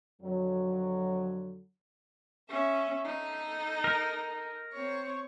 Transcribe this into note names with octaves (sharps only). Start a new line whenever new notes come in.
F2 D3 F#3
C#4 E5
D#4 A4
A#4
C4 C#5